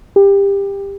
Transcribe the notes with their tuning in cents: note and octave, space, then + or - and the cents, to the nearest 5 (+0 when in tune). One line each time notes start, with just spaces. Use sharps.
G4 +20